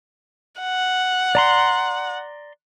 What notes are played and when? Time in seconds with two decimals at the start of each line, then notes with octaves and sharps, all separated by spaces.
0.60 F#5
1.35 D5 A#5 C6